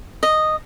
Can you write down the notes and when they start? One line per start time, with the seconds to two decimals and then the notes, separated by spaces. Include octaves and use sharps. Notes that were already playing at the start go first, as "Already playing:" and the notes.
0.23 D#5